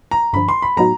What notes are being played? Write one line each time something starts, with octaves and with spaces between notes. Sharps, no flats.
A#5
G2 D3 F3 B5
C6
B5
A2 F#3 B3 D#4 F#4 A#5